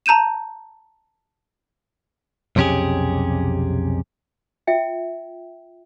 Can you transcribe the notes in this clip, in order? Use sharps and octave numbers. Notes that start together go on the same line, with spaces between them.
A5 A#5 G6 D#7 E7
B1 F2 C3 C#4 G4 G#4
F4 E5 G5